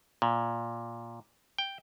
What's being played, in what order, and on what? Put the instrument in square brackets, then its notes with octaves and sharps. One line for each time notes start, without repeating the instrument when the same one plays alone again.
[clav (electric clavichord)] A#2
G5